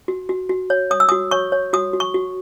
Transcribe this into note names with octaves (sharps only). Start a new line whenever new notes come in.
F#4
F#4
F#4
C#5
C#5 D#6
E6
F#4 D#6
C#5 C#6
C#5
F#4 D#6
F#4
C#6
F#4